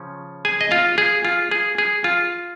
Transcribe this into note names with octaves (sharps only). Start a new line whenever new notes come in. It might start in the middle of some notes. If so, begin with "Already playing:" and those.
Already playing: C#3 F3 C#4
G#4 G#5
D#5
F4 F5
G#4
F4
G#4
G#4
F4